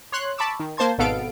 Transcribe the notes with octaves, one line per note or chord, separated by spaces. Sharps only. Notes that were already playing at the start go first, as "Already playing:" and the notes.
C#5 C6 F#6
A5 B5 C#6 D6 E6
D#3
A#3 C5 A5 C6 G#6
G#1 B2 B3 A4 F5 D7